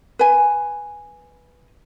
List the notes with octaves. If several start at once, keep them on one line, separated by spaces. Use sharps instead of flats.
B4 G#5